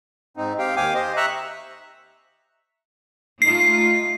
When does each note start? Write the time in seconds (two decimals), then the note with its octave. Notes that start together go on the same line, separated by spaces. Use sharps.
0.37 G#2 C4 D#4
0.59 C4 G4 F5 G5
0.76 D#2 F5 G5 G#5 D6
0.94 G4 C5 D#5
1.17 E5 A#5 C#6 E6 F#6
3.42 A3 D#4 F4 C7